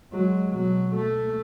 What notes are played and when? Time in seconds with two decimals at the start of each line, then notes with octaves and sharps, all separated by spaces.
0.12 F#3 G#3
0.49 B2 F#3
0.96 A3